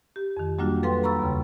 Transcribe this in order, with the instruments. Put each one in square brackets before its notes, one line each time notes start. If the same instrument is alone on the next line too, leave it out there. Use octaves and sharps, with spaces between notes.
[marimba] G4
F2 D#3
F#3 G3 A#3 D4 F4 F#4
F#3 A4 B4 F5 G5 C6
A#5 B5 C#6 E6 A6
D#2 C#3